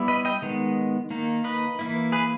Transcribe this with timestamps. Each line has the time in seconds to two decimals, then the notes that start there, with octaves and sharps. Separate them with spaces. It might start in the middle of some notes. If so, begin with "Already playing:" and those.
Already playing: G3 B3 E4
0.08 B4 D#5
0.25 D#5 G5
0.42 D#3 G#3 B3
1.11 D#3 A#3 D#4
1.44 B4 D#5
1.79 E3 A#3 E4
2.12 G#4 B4